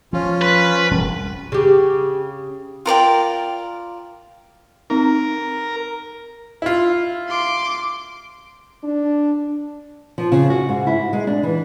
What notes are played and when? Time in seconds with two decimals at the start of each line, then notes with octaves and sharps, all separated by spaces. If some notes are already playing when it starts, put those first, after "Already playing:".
0.13 F3 C#4 F4
0.42 B4
0.91 E1 G3 C#4
1.52 C#3 G4
2.86 F4 A#4 D5 G5
4.90 C4 D#4 A#4
6.62 E4 F4
7.28 C6 D6
8.84 D4
10.18 F3
10.32 C#3
10.50 F#4
10.69 G#2
10.87 E4
11.13 G#3
11.27 D4
11.43 E3